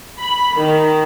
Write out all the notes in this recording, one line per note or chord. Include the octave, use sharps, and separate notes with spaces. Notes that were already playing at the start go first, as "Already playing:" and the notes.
B5
D#3